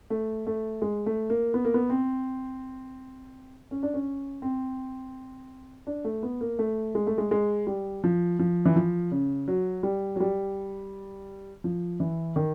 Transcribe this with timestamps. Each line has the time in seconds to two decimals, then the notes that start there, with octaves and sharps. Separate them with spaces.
0.10 A3
0.47 A3
0.82 G#3
1.06 A3
1.30 A#3
1.54 B3
1.65 A#3
1.74 B3
1.90 C4
3.71 C#4
3.83 D4
3.94 C#4
4.42 C4
5.87 D4
6.04 A3
6.23 B3
6.41 A#3
6.59 A3
6.95 G#3
7.07 A3
7.18 G#3
7.31 G#3
7.67 G3
8.04 F3
8.39 F3
8.66 E3
8.76 F3
9.11 C#3
9.48 F#3
9.83 G3
10.16 F#3
10.20 G3
11.64 F3
12.00 E3
12.36 D#3